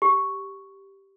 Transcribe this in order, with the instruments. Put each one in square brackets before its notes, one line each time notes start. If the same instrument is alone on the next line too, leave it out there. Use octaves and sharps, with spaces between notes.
[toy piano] G4